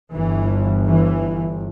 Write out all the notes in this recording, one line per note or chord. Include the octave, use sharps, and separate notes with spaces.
G1 G2 E3
E3